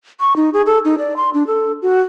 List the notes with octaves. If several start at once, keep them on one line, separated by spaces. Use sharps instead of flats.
C#6
D#4
G#4
A4
D#4
D5
C6
D4
A4
F#4